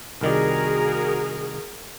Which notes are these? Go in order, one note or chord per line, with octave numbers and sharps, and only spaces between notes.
C2 D#3 F#4 G#4 A#4 D5